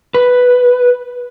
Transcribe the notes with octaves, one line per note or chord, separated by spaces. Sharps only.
B4